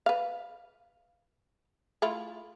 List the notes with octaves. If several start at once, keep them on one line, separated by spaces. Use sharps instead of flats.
B4 F5
A3 E4 F4